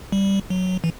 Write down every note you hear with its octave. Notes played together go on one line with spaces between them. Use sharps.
G3
F#3
E3